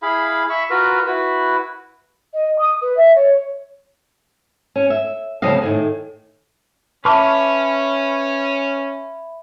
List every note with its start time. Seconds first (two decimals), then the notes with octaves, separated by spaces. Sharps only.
0.02 E4 G#4 F5 B5
0.50 E5 B5 C#6
0.70 F4 F#4 A#4 B4
1.07 E4 F#4 B4
2.33 D#5
2.58 D#6
2.81 B4
2.96 E5
3.15 C#5
4.76 C#4
4.90 E5
5.42 D2 C#3 F3 G3 D#5 F5
5.62 A2 D#3 G#4
7.05 C#4 B4 E5 A5 B5 C#6 D6 F6